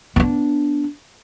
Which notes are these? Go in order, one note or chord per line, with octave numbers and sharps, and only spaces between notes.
B3 D4